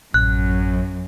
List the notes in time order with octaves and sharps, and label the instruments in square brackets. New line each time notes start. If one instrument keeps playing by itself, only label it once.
[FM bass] A1 [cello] F#2 [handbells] F#6